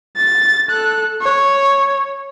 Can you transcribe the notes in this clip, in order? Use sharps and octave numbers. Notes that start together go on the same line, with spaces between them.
A6
A4 F#6
C#5